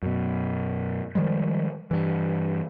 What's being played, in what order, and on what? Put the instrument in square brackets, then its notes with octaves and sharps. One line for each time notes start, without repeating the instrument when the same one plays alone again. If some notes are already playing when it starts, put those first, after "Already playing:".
[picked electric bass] F#2 B2
D#3 F3 G3 G#3
G2 E3